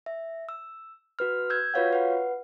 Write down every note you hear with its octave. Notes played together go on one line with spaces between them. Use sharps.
E5
E6
F#4 B4 F6
E6 G6 G#6
F4 F#4 B4 C#5 F5 F#5
B4 F#5